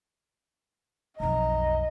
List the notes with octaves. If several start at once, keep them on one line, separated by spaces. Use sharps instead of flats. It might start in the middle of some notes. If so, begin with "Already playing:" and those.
B1 F2 D#5 A#5